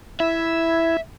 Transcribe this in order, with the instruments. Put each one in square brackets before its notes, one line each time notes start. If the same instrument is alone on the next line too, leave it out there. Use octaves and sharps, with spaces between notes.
[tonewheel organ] E4 [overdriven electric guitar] E5